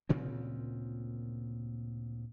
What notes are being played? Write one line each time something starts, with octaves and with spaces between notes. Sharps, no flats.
D2 A#2 C#3 C4